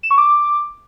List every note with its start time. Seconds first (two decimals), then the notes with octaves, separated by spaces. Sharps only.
0.03 E7
0.11 C#6
0.18 D6